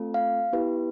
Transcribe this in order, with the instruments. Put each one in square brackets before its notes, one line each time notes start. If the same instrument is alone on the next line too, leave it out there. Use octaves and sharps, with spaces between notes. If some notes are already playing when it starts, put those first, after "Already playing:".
Already playing: [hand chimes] A3 C4 F4 A4
F5
B3 E4 G4 B4